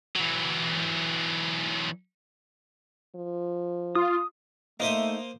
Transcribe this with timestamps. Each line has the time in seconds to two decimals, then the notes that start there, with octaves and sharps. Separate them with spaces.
0.16 E3 F#3
3.15 F3
3.95 F4 D#6
4.80 A3 A#3 D#4 C5 E5 D#6